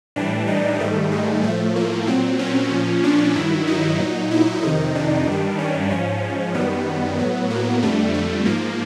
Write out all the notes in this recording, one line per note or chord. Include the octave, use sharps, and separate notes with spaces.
A2 E3 G3 D4
D#4
G#2 D#3 G3 A3
G#3
A2 F3 A3
A#3
A#2 F#3 C4
C#4
A#2 F3
D4
G2 D#3 F#3 E4
D#4
A#2 F#3
E4
F2 C3 D#3 D#4
D4
G2 D#3 G3
C#4
G#2 F3 C#4
F#2 D#3 G3 B3
A2 F#3
A#3
F2 D3 G3 A3
A3
G#2 F3 A#3